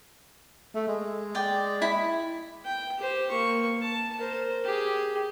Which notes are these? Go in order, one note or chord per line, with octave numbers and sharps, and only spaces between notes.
A3
G#3
D5 G5
E4 B5
G5
G4 C5
A#3 C#6
A5
A#4 C5
G4 G#4